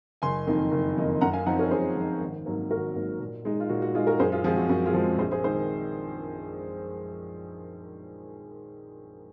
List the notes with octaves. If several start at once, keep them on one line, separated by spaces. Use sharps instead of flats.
F#1 G#5 C6
F2 D#3 A#3 D#4
F#1
F2 D#3 A#3 D#4
F#2 F#5 A#5
F5 G#5
F3 C4 D#4 F#5 A#5
A#4 C#5
F#2 G#4 C5
F3 C4 D#4
G#1
G#2 F#3 A#3
G#1 F#4 A#4
G#2 F#3 A#3
A#2
G#3 D#4
F4
A#2 F#4
F#4
G#3 D#4 F4 G#4
F#4 A#4
F#2 G#4 C5
F4 G#4
F3 G#3 C4 F4 G#4
F#4
F#2 F#4
F4 G#4
F3 G#3 C4
A#1 G#4 C5
G#4 C5
D#3 G#3 G#4 C5